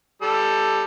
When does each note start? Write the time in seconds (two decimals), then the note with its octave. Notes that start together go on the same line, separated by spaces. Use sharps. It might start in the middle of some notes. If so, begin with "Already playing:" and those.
0.22 G3 A4 E6